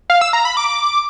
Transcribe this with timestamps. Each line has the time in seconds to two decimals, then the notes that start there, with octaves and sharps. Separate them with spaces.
0.10 F5
0.21 E6
0.33 A#5
0.45 B5
0.57 D6